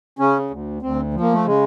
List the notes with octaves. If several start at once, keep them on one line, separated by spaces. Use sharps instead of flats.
C#3 C#4
D2
D2 C4
F3
A#3
A3
C#3 G#3